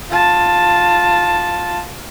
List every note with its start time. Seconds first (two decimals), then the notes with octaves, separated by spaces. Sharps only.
0.10 F4 A5